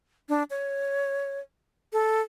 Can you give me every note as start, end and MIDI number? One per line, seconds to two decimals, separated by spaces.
0.29 0.43 62
0.50 1.40 73
1.93 2.21 69